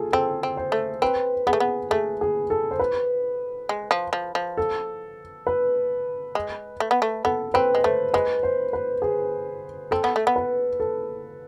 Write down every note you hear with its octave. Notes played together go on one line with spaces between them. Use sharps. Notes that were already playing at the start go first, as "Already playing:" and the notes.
Already playing: F4 G#4 A4
C4 A4
C4
C5
A3
C4 B4
B3 G#4
A3
B3
A3 G#4
G#4
A4
C5
B4
G#3
F3
F3
F3
A4
B4
G#3
A3
B3
A3
B3 A4
C4 B4
G#3
A3 C5
G#3 B4
C5
B4
G#4
C4 A4
B3
A3
B3
B4
A4